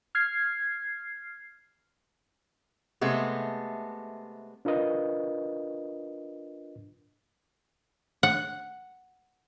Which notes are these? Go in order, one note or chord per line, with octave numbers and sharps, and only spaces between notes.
F6 G#6 C7
C3 G#3 A3 B3
D4 F4 A#4 B4 D#5
F#5